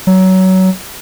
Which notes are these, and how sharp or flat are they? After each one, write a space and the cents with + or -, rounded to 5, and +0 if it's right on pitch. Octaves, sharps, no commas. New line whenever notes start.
F#3 +20